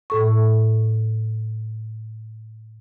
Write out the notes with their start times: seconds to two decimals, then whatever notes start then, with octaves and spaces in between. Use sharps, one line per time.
0.10 A2 A4 C#6